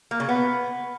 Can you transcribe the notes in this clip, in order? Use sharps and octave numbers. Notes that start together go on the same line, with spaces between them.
A#3
C#3
B3